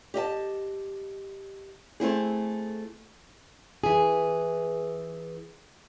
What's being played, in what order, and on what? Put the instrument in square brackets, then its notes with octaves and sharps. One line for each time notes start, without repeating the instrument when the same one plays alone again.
[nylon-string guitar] G4 D#5 E5 A5
A3 C4 E4 G#4
[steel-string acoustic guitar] E3 G#4